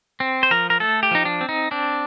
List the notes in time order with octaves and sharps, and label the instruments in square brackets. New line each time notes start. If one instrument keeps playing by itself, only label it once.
[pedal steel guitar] C4
C5
F3 A#4
A#4
A3 A4
G4
F3 D#4
D4
C4
D#4
C4 D4